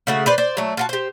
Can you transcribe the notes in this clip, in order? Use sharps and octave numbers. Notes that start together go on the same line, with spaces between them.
C#3 A3 F#4
B4 C5 D5
C5 D5
F#3 A3
F4 F#4 A5
G4 C5